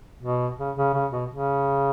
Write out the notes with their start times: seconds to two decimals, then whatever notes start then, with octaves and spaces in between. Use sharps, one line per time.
0.23 B2
0.59 C#3
0.76 C#3
0.93 C#3
1.12 B2
1.30 C#3